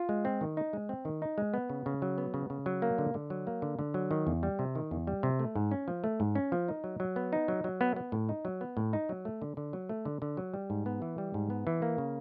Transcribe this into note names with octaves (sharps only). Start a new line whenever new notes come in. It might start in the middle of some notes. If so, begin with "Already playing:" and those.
Already playing: F4
G#3
C4
D#3
D#4
G#3
C4
D#3
D#4
G#3
B3
C#3
C#3
F#3
B3
C#3
C#3
F#3
A#3
D3
D3
F#3
A#3
D3
D3
F#3
D#3
E2
G3
C3
D#3
E2
G3
C3
A3
G#2
C#4
F3
A3
G#2
C#4
F3
D#4
F#3
F#3
B3
D#4
F#3
F#3
B3
B3
A2
D#4
F#3
B3
A2
D#4
F#3
A3
D3
D3
F#3
A3
D3
D3
F#3
G3
G#2
B3
E3
G3
G#2
B3
E3
A#3
C#3